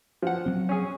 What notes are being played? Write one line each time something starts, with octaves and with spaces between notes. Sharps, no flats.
F3 F#5
F#3 C4
C#4 G#4